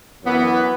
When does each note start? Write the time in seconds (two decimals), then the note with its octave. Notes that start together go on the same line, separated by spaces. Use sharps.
0.23 F#2 E3 B3 E4